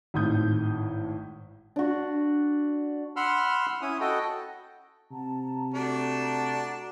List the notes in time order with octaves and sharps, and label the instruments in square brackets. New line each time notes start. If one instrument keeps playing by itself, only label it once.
[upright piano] G#1 A2 D#6 G6
[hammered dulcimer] D4 F#4
[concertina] F#5 B5 C6 E6 F6
C#4 E4 D#6
F#4 A4 D#5 G5
[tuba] C3 [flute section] F#5 A5 A#5
[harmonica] A3 D4 [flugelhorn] F#4